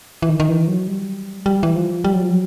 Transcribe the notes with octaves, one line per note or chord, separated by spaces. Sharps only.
E3
D#3
D#3
E3
F#3
G3
G3
E3
F3
G3
F#3
F3
F#3